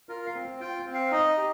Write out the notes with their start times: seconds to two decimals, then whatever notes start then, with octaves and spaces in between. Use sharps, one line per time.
0.09 F4 A#4
0.26 F5
0.35 C4
0.60 F4 G5
0.86 C4
0.94 F5
1.11 D#4 D#5
1.37 G4